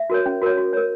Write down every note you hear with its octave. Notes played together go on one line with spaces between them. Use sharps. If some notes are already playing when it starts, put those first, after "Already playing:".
Already playing: E5
F#4 A#4 C#5
C#4
F#4 A#4 C#5
F#4
A#4 C#5